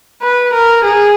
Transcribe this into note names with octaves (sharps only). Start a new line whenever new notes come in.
B4
A#4
G#4